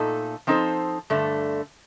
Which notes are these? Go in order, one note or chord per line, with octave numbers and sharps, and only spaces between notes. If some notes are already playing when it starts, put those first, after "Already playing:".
Already playing: A#2 A3 D#4 A4
F3 C4 D#4 A4 C5
G2 D3 A3